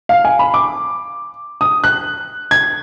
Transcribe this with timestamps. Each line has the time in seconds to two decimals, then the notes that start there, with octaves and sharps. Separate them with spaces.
0.09 F5
0.25 G#5
0.39 B5
0.54 D6
1.61 D#6
1.84 F#6
2.51 G#6